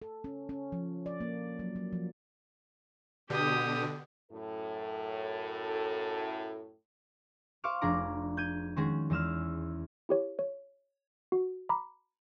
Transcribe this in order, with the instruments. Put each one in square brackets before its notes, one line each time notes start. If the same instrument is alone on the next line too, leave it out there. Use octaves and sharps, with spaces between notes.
[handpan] A4
C#4
C#4
F3
D5
A#3
F#3
F#3
F3
[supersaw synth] B2 D3 [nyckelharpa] G4 D#6
[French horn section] F#2 A2 A4
[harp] C5 F5 C#6 D6 F6
F1 D4 G#4 D5 A#5 D6
G6 G#6 D#7
D#3 G#3 C#4 F#4 G#4
E2 G#3 E6 F6
[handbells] E4 G4 C#5
C#5
F#4
A#5 B5 D6